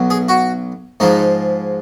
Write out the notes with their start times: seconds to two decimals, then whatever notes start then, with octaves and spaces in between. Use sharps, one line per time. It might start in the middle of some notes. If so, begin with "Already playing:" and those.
Already playing: B1 B2 F#3
0.10 G#4
0.28 F#4
1.00 G#2 F3 G#3 D#4